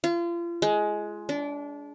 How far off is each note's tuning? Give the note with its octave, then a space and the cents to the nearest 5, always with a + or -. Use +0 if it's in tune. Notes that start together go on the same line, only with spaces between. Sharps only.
F4 -35
G#3 +15
D4 -25